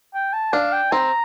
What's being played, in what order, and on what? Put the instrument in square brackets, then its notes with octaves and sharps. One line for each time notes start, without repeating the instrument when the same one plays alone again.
[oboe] G5
A5
[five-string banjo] D4 [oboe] F5
[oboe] G5
[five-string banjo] C4 [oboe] A#5